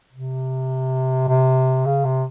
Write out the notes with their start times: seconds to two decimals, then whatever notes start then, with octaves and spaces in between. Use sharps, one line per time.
0.12 C3
1.28 C3
1.86 C#3
2.05 C3